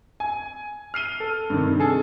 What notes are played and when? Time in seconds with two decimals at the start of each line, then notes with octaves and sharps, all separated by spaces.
0.20 G#5
0.94 F6 C7 D#7 G7
1.20 A4
1.50 G2 C3 D#3
1.80 G#4 A4 G#5